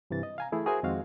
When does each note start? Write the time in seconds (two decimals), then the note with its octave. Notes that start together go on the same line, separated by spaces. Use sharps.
0.10 G2 C3 E3 A6
0.23 D#5
0.38 F5 G#5 A#5
0.52 E3 A3 E4 G#4
0.66 F#4 G#4 A#4 C5 E5 G#5
0.83 F2 D#3 G#3 C4 F#4 F5